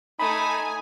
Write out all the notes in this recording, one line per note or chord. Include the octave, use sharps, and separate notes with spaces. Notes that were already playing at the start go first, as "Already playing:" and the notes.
A3 D#4 G#5 B5